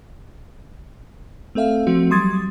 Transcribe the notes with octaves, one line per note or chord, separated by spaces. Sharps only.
A3 C4 A4 E5 F5
F3 A3 C4 F#4
F#3 G3 C6 D#6 G#6 A6